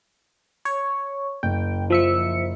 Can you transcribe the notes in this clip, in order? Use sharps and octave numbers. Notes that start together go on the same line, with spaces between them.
C#5
F#1 G5
F3 E5 C#7